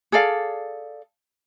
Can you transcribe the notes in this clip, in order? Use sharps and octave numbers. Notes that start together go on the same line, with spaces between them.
G#4 A4 D5 F5